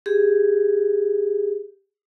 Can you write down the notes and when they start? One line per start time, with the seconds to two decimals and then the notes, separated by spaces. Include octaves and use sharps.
0.06 G4 G#4